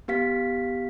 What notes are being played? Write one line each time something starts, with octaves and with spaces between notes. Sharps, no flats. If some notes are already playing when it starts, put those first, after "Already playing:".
B3 G4 F5 B6